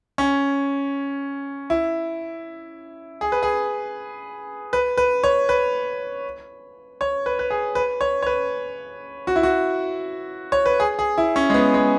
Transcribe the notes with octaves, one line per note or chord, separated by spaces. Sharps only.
C#4
E4
G#4
B4
G#4
B4
B4
C#5
B4
C#5
B4
B4
G#4
B4
C#5
C#5
B4
F#4
E4
F#4
C#5
B4
G#4
G#4
E4
C#4
G#3
B3
G#3